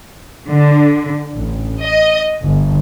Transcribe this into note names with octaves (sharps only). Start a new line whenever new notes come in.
D3
A1
D#5
G1